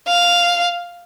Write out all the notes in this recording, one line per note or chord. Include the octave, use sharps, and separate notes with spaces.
F5